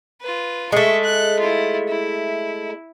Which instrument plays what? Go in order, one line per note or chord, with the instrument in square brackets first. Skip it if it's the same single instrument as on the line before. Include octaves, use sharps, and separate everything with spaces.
[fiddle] F4 B4
[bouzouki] G#3 A3 [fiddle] E5 C#6
[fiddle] F#6
E4 F4
E4